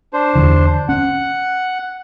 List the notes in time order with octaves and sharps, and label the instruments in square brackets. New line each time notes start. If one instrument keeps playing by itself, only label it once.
[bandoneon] D4 C5
[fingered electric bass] E2 D3 E3
[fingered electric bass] C#4 [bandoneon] F#5